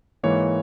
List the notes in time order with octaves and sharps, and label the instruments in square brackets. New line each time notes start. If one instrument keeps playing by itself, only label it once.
[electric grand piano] G#2 E3 A#3 C#5